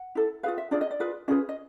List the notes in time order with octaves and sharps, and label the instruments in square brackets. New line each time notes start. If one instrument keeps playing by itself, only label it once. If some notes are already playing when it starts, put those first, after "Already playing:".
Already playing: [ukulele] F#5
E4 A4
F4 G#4 B4 F5
E5
D4 F4 G#4 D5
D#5
D5
F4 G#4 B4
C#4 F4 G#4 B4 D#5
D#5